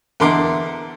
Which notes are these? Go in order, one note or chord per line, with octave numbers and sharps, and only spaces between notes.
E2 D3 A#4 C6 D6